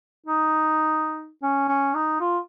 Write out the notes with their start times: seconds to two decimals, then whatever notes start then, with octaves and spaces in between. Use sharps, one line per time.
0.26 D#4
1.43 C#4
1.68 C#4
1.94 D#4
2.20 F4